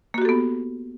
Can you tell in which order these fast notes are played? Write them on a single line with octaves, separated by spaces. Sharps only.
A#3 F#4 G4 A4 B3